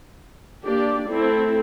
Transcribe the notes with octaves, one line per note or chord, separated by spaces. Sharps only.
A#3 D4 G4 D5
A3 C4 E4 A4